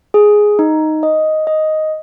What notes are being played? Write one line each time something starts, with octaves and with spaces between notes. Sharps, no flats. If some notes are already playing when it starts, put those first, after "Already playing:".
G#4
D#4
D#5
D#5